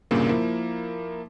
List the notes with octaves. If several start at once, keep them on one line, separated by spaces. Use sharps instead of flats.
C2 G2 A#2 C#3 A#3
F3 A#3 E4